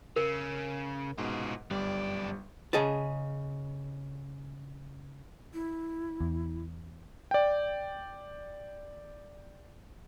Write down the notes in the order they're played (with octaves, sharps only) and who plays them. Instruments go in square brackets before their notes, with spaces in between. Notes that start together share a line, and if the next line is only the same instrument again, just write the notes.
[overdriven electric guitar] C#3 [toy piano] A#4
[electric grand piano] G#2 B2 [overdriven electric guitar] F4 G#4
[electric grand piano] G1 G3 [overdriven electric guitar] F#2 D5
[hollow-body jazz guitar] C#3 G#4 D#5 A5
[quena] E4
[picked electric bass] E2
[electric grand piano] D5 G5